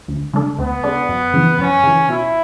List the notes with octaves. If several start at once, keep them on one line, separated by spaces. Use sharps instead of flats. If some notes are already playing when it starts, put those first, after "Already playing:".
D2
C#3 G#3 D4 A4
D2 B3
C#3 G#3 D4 A4
F#2
C#3 E3
F#2 C#4
C#3 E3
B2 E4